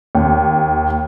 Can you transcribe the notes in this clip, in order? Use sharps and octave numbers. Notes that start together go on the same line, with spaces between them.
D#2